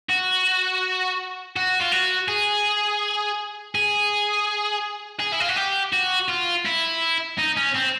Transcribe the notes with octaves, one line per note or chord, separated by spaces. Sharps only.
F#4
F#4
F4
F#4
G#4
G#4
G#4
E4
F4
F#4
G4
F#4
F4
E4
D#4
C#4
C4